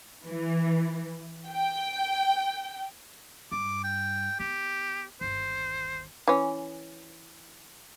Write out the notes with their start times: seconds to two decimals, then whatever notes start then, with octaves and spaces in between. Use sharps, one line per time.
0.24 E3
1.49 G5
3.52 G2 D6
3.84 G5
4.40 B3 G4
5.21 G1 D#2 C5
6.28 E3 C#4